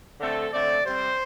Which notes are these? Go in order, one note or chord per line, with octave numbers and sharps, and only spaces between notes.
D3 A3 C4 A4
D3 A3 C4 D5
C3 G3 C4 C5